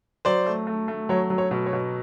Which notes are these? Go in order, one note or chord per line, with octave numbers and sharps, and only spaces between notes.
F#3 C5 D5
A3
A3
A3
F#3 C#5
F#3
C#5
B2
C#5
B2